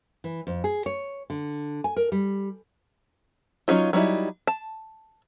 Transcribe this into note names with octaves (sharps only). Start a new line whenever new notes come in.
E3
F2
G#4
C#5
D3
G#5
A#4
G3
F#3 C#4 D#4 F4
F#3 G3 B3 D#4 E4
A5